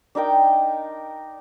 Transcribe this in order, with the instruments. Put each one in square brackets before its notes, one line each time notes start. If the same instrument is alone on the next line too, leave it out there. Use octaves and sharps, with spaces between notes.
[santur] D4 D#4 A#4 G5